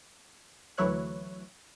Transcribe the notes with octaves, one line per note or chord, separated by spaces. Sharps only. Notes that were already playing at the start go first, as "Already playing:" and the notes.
D2 E3 F#3 E4 C#5 F#6